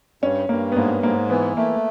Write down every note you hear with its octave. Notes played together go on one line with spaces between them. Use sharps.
G2 C#4
G2 A#3
B3
G#2 A#3
G#2 A#3
E3 B3
A3 A#3